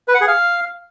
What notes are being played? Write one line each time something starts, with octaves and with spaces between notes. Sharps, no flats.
B4
F#5
G#4
F5